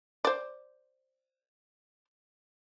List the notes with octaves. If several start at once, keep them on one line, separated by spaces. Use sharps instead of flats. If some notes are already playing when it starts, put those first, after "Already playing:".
C5 D5